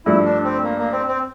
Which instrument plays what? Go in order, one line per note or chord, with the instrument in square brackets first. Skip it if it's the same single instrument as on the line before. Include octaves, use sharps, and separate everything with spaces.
[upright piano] G2 F3 A3 [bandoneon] E4
[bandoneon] D4
C4
A#3
A#3
C4
C4